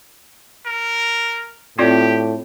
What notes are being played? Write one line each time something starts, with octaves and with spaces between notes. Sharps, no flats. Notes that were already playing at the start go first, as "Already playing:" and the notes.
A#4
A2 C4 F4 G4 D5